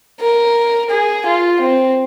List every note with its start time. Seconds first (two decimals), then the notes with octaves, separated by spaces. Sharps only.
0.20 A#4
0.90 G#4
1.26 F4
1.60 C4